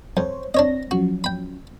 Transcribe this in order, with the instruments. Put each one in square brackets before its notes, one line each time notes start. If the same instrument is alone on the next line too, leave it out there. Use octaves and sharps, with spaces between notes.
[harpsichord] F2 [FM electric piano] C5 C#5
[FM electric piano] C4 A#6 [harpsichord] D4 C#5 D#5
[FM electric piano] F3 F#3 C#4 [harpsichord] F#4
[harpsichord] G5 B5